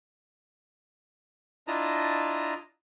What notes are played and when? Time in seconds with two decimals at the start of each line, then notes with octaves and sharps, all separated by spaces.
1.68 D4 E4 F4 D#5 A5 A#5